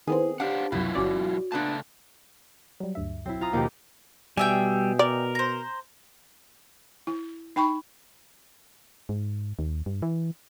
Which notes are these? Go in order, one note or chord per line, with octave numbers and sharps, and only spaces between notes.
D#3 B3 C4 E4 G#4
D4 G4 C5 F5 F#5
C2 F#2 B2 F#3 E4 F4
G1 C#4 F#4 D5
A#2 C#3 A3 B3 D4 A5
F#3 G3
D2 G2 E5
B1 F#3 C4 E4
F4 A#5 D#6
D#2 B2 F3 A#3 G4
B2 G3 G#4 E5 G5
A#4 D5
C5 A#5
E4
D#4 G5 B5 C#6
G#2
D#2
G2
E3